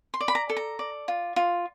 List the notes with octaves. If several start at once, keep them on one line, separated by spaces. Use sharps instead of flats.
C6
D5
B5
A#5
A4
A#5
D5
F4
F4